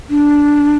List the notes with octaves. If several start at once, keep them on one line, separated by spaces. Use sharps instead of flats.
D4